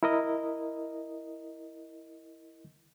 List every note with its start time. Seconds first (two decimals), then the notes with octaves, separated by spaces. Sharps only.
0.03 E4 A#4 D#5